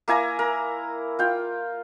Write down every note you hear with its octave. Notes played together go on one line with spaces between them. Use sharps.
A#3 E4 G#5 A#5
A#4
F4 G5